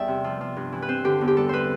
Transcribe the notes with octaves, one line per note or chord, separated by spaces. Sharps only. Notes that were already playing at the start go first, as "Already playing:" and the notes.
Already playing: E2 G3 D5 E5 G5
C3
F3
F3
G2
E3
B4
C4 C5
D3 G4
E2
G4
G3 A4
G3 B4 C5